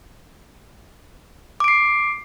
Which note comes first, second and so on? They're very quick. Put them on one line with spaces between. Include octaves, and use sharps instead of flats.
D6 D7 C7